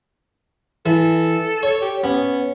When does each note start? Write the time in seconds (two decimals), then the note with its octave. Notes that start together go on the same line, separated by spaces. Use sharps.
0.86 E3 A4
1.63 C#5
1.82 G4
2.04 B3 C#4